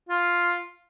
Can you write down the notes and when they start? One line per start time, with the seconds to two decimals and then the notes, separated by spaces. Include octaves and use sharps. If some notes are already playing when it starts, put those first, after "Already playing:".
0.09 F4